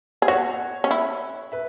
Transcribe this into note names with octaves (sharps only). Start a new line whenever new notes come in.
G#4
F#4 C#5 F#5
C#4
E4
B4 E5